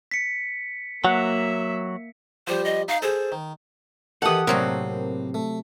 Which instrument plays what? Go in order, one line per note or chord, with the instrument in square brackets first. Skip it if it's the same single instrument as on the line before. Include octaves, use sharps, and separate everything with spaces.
[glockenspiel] B6 C#7
[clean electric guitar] F#3 [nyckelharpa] A#3 E5 [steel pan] F#5
[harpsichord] F3 G3 [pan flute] C5
[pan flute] D#5
[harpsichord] D#4 [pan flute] F5
[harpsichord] G#4 A4 [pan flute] C5
[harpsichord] D#3
[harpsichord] D#3 E3 [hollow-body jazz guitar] G4 A4 [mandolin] F#5 D#6
[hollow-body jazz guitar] A2 C4 A#4 [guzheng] C3 F#3 F#4 [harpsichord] A#3
[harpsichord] A3